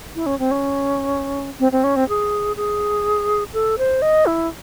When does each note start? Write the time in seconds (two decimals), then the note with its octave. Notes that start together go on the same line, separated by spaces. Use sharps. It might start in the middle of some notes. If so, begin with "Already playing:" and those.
0.15 E4
0.26 C#4
0.39 C4
0.51 C#4
1.60 C4
1.72 C4
1.84 C#4
1.96 C4
2.09 G#4
2.57 G#4
3.54 A4
3.78 C5
4.02 D#5
4.26 E4